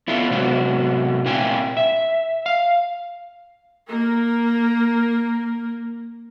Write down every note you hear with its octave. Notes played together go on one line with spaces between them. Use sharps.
B3 E4 F4 A4
C3 F#3 G#3 B3 F#4
A#2 C4 E4 F5 G5 G#5
E5
F5
A#3 A#4